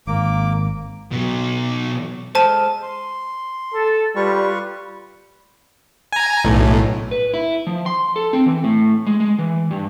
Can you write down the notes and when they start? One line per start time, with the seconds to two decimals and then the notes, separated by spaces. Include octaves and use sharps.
0.07 G#1 A#3 D6
1.12 B2 F#3
2.35 G#3 A4 C5 A5 F6 D#7
2.82 C6
3.74 A4
4.16 G3 F4 B4 C#6
6.13 G#5 A#5
6.44 B1 A2
7.11 B4
7.34 E4
7.67 F3
7.86 C6
8.16 A4
8.33 C4
8.46 E3
8.64 A2
9.06 G#3
9.20 G#3
9.39 E3
9.71 G2